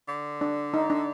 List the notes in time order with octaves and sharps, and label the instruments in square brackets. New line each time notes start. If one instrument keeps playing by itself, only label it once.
[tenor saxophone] D3
[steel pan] D4
D#4
D4